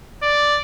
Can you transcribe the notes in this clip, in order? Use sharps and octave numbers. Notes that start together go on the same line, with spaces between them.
D5